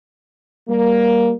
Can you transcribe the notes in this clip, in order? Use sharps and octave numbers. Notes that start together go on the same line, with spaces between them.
G3 A#3